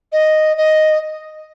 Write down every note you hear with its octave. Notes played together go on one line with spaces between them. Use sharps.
D#5
D#5